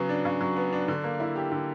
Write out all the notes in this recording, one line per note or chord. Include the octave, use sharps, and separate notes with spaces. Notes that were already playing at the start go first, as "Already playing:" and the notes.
Already playing: C#3 F#3 B3
D4
C#3
F#3
B3
D4
D3
A#3
E4
G4
D3